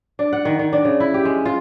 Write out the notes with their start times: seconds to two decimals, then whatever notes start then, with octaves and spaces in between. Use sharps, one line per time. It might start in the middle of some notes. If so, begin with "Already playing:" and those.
0.19 D4
0.33 F#5
0.45 D#3
0.59 D#3
0.73 D4
0.85 C#3
1.00 E4
1.14 G4
1.25 G#3
1.45 F4